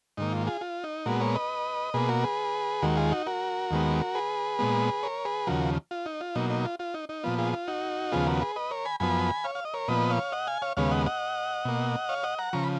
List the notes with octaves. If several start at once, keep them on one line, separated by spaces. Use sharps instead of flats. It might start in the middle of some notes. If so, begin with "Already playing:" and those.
G#2 D#3 A#3 D#4
F4
F4 G#4
F4
D#4
A#2 G#3 B3 F#4 A#4
A#4 C#5
B4 D#5
B2 A#3 G#4 B4
F#4 A#4
G#4 B4
D#2 D#3 G#3 F#4 A#4
F4 G#4
D#4 F#4
F#4 A#4
D#2 D#3 G#3 B3
G#4 B4
A#2 G#3 B3
A#4 C#5
G#4 B4
D#2 C#3 F3 F#4 A#4
F4
D#4
F4
B2 F#3 A#3 D#4
D#4
F4
F4
D#4
D#4
A#2 F3 B3 F4
F4 G#4
F4
D#4 F#4
D#2 C#3 F3 B3 F4 G#4
F#4 A#4
G#4 B4
B4 D#5
A#4 C#5
G#5 B5
F#2 F3 B3 G#5 B5
C#5 F5
F5
D#5
A#4 C#5
A#2 F3 B3 B4 D#5
C#5 F5
D#5 F#5
F5 G#5
C#5 F5
D#2 C#3 G#3 B3 C#5 F5
D#5 F#5
D#5 F#5
B2 A#3
C#5 F5
D#5 F#5
F#5 A#5
C#3 F3 A#5 C#6
B5